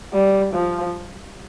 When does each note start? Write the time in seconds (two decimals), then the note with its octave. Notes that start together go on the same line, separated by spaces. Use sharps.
0.13 G3
0.54 F3